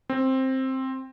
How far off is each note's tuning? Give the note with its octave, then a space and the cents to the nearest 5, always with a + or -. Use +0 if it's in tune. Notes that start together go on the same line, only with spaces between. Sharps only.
C4 +10